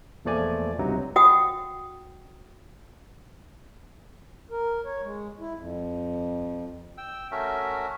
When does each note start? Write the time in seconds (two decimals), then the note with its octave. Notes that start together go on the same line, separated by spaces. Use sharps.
0.25 E2 A#2 F3 A3 D5 G#5
0.79 C#2 G2 C3 F#3 D#4
1.16 F#4 F#5 G5 D#6
4.51 A#4
4.85 C#5
5.03 G#3
5.40 E4
5.57 F2
6.98 G5 E6
7.31 A3 C#4 F#4 A#4 E5